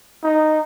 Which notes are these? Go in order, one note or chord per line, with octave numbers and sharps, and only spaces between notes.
D#4